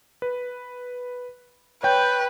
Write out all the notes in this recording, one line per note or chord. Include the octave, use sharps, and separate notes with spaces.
B4
B4 C#5 G5 G6